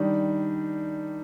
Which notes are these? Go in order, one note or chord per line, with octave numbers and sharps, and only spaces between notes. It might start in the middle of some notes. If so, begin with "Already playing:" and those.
Already playing: D#3 G3 D4